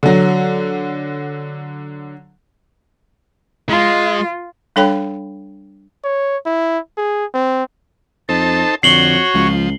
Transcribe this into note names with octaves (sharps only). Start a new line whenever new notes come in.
D3 F#3
G#3 F4
G3 D4 A4 C#5 G5 B5
C#5
E4
G#4
C4
F2 D#4 A4 C5 A5
F2 D3 F#4 C#5 C7 F#7 G7
C#2 F3